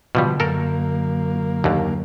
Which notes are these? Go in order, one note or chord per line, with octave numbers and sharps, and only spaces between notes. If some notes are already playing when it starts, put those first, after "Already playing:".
B2 D3 F3 G3
F#2 A#3 A4 A#4
D#2 D3